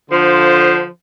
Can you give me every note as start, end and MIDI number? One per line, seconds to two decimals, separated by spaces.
0.11 0.86 50
0.11 0.86 53
0.11 0.86 72